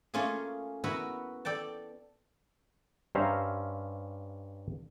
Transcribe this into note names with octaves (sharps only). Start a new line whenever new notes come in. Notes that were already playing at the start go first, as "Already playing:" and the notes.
A3 A#3 C#4 F4 G#4
B3 E4 F#4 A#4 F#5 B5
A4 D5 G5 A5
G2 C#4 C5 E5 F5 A#5